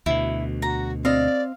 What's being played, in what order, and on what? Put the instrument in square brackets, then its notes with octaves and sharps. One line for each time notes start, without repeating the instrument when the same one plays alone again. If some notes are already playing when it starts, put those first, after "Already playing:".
[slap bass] D2 B2 [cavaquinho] E4
[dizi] F#4 [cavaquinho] A#5
[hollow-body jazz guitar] C4 D#5 [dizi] D5 [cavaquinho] F5